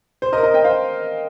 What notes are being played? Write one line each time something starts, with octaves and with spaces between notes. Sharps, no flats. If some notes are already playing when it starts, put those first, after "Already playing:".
C5
A#4 D#5
A#4 D#5
D#5 G5
C5 F5